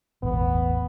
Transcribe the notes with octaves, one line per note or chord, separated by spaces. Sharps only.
E1 A1 B3